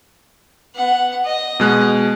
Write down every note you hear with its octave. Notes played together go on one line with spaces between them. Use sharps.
B3 F#5
D#5
B2 G#3 F#6